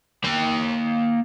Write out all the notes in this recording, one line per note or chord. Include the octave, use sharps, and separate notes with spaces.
A#3 G5